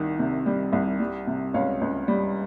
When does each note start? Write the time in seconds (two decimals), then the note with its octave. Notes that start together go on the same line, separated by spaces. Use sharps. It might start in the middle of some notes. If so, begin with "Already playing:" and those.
Already playing: C2 D#3
0.19 C3
0.46 G3
0.73 C2
1.00 G3
1.27 C3
1.54 C#2 C#5 F5
1.81 C#2
2.08 G3